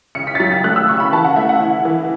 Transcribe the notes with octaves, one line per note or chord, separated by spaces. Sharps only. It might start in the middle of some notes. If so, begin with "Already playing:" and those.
C#3 C#7
B6
A6
F#3 B6
A6
A3 F#6
E6
C#3 C#6
B5
E3 A5
F#5
A3 E5
F#5
E4
E3